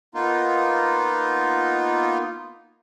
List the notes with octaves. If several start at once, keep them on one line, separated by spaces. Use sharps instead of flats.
A#3 B3 D#4 F4